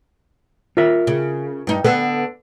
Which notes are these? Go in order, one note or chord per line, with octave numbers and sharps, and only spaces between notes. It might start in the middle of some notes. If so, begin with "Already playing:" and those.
F4 A#4 E5
C#3
G2 D#4
D3 B3 A4